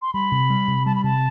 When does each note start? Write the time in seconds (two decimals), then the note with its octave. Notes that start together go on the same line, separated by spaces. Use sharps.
0.02 C6
0.14 G3 B5
0.32 C3
0.50 G3
0.68 C3
0.86 G3 A5
0.95 B5
1.04 C3 A5